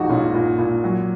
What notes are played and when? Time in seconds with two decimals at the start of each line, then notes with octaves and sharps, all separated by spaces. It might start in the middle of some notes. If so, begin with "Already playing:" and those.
Already playing: A#1 F3 D#4 F#4 G#4
0.09 A#2 C#4 F4
0.34 A#2
0.58 A#2
0.84 F#3